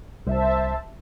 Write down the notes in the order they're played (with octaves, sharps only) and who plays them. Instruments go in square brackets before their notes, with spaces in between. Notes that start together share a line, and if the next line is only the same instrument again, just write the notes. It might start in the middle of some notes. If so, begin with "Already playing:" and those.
[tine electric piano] C2 [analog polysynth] C5 E5 A5